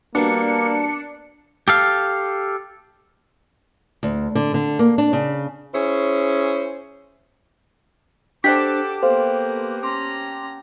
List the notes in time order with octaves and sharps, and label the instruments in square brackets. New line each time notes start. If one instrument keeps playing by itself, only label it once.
[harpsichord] B2 G3 B3 [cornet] A#3 [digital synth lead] D4 [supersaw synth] C#7
[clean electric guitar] G4 A4 F5
[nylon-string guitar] D2
D3
D3
A#3
D4
C#3
[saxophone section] C#4 E4 G#4 C5 C#5
[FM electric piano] D4 C5 [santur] G4 F#5 A5 [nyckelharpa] A4 D6 [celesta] B6
[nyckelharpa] A#3 B3 [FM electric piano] A4 F5 C6 [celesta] C5
[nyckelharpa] C#4 A#5 [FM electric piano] C6 D6